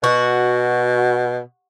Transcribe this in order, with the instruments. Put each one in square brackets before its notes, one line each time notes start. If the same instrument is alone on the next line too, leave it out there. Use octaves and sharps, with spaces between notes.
[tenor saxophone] B2 [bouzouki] F#4